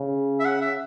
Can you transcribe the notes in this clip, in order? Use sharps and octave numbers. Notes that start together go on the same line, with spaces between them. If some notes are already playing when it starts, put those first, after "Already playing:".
Already playing: C#3
E5
F#5
E5